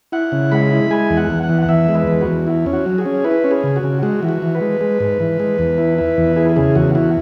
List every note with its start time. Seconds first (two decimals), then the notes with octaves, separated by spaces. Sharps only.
0.12 E4 F#5
0.32 C#3
0.51 G#3 B5
0.71 E4
0.91 G#3 G#5
1.10 E2
1.17 F#5
1.30 E2
1.43 F#5
1.49 E3
1.62 F#5
1.69 E2 E5
1.88 G#3
1.95 B4
2.07 E2
2.21 F#4
2.27 E2
2.47 E4
2.66 C#4
2.73 F#4
2.86 F#3
2.98 G#4
3.05 C#4
3.24 E4 B4
3.44 C#4
3.51 G#4
3.64 C#3
3.76 F#4
3.83 C#3
4.02 G#3 F#4
4.23 E3
4.29 F#4
4.42 E3
4.55 B4
4.61 G#3
4.81 G#3
5.00 G#2
5.20 E3
5.40 G#3
5.59 E2
5.78 E4
5.98 E4
6.17 E2
6.36 E4 G#4
6.56 C#3 G#4
6.75 E2 F#4
6.95 E4 F#4